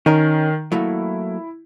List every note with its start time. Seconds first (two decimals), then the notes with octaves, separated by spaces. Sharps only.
0.06 D#3 C#4 D#4 A#4
0.72 F#3 A3 A#3 E4